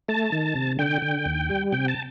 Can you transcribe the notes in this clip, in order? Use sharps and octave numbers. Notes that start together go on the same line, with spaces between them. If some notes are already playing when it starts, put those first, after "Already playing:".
A3 A5
D#3
C3
D3 G5
D3
D#2
G3
C3 G5
A5